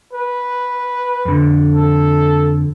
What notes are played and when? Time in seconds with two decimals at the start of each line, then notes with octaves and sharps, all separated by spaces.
0.13 B4
1.25 F2 D3
1.75 A4